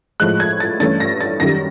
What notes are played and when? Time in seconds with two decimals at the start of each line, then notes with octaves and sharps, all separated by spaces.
0.20 A2 F3 G#3 F#6
0.40 G#6
0.60 A6
0.80 G2 E3 A3 C#4 A6
1.00 A#6
1.21 A6
1.40 F#2 D#3 G3 A#6